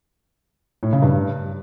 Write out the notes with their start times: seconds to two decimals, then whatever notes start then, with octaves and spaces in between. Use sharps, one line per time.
0.83 A2
0.93 C#3
1.02 G2